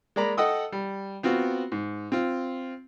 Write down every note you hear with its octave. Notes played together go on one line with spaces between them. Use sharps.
G#3 A#3 D5 A#5 B5
A4 D#5 F#5 G5 D#6 E6
G3
B3 C4 F4 F#4
G#2
C4 F4